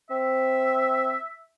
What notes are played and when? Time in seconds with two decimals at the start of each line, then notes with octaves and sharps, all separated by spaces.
0.10 C4 E5